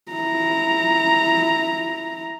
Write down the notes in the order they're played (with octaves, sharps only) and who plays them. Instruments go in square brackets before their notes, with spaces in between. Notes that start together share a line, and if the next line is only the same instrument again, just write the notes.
[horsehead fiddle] E4 A#5